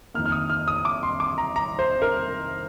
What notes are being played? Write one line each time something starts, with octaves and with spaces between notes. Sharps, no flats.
F2 D#3 A#3 F6
F6
D#6
F6
D#6
D6
C6
D6
A#5
A#5
C5
A#4